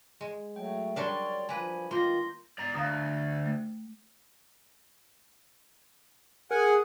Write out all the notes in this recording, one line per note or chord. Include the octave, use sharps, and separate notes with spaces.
G#3
F#3 A3 G5
F#3 G3 D4 A#4 C#5 D5 G5 C6
F3 A#3 B4 G#5 B5
D#3 A#3 F4 C6 G6 A#6
D5 A#5
D2 F5 A#5 D#6
A3
G#4 A#4 F#5 G#5